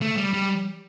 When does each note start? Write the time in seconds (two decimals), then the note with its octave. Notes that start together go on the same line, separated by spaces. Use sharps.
0.01 A3
0.17 G3
0.33 G3